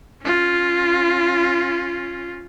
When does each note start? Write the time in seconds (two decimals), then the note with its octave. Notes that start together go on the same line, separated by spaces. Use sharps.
0.22 C#4 F4